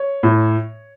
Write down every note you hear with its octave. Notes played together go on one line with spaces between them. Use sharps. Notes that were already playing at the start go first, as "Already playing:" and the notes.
Already playing: C#5
A2